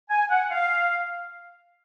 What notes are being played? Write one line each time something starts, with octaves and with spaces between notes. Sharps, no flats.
G#5
F#5
F5